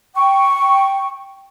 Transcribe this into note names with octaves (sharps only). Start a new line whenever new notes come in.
G5 C#6